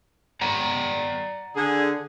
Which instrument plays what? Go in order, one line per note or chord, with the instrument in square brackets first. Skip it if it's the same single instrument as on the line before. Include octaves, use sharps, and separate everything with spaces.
[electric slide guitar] D5 F#5 A#5
[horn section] D3 G#4